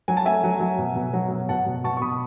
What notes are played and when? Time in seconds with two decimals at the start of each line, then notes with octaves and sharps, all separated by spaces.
0.08 F#3 G#5
0.17 A5
0.25 A3 E5 G#5
0.44 F#3
0.60 F#3
0.78 B2
0.96 B2
1.13 F#3
1.31 F#3
1.49 B2 F#5 A5
1.66 B2
1.84 B2 A5 C#6
1.97 C#6
2.02 B2 B5 D#6